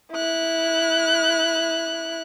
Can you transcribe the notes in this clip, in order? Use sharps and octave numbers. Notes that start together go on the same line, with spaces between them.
E4 F#6